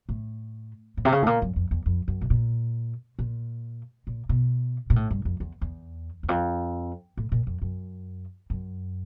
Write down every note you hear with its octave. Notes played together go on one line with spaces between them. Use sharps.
A2
A2
C3
C#3
A2
A#2
F#2
F2
E2
F2
F#2
B2
A#2
A#2
A#2
B2
A#2
A2
G2
F2
E2
E2
E2
F2
A2
A#2
F2
F#2
F#2